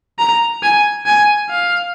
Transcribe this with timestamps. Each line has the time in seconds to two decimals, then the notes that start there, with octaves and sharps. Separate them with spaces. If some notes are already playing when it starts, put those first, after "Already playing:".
0.19 A#5
0.63 G#5
1.06 G#5
1.50 F5